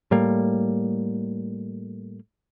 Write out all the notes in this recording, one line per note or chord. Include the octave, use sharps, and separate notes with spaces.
A2 G3 A#3